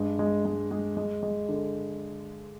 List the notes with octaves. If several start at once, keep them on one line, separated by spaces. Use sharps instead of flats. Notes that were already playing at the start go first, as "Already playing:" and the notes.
Already playing: G2 G#3
G#3
G#3
G#3
G#3
G#3
D3